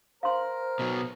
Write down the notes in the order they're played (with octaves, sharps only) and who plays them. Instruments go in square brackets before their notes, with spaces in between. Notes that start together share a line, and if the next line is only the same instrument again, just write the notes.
[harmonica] A#4 [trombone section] C5 [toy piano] F5 C6
[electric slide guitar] B2 F#3